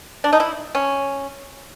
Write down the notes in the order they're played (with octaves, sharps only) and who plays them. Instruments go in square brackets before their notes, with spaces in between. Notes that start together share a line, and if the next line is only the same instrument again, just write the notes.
[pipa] D4
D#4
E4
C#4